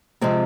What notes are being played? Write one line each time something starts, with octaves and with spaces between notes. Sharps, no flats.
C3 F3 G#3 C4